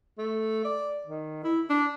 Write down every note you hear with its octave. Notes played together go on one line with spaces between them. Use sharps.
A3
D5
D#3
E4
D4